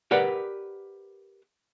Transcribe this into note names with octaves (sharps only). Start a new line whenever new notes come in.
G4 A#4 B4 D5 F#5